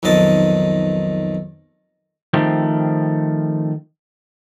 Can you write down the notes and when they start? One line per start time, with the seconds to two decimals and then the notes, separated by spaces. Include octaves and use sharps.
0.03 B1 F2 D#3 D#5 A5
2.33 D#3 F3 A3 C4 G4